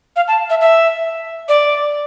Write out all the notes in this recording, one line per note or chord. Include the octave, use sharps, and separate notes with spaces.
F5
A5
E5
E5
D5